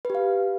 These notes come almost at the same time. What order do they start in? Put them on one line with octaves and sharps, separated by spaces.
B4 G4 F5